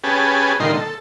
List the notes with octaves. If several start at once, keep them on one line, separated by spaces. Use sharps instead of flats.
C#4 G4 G#4 B4 A5
A#2 D3 D#3 G3 D#4 C6
A4